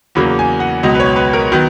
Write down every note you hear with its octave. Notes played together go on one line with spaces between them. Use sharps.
E2 C#3 F#3 A#3 B5
G#5
F#5
C#2 B2 F#3 D#5
B4
C#5
B4
A#4
D#3 F#3 B3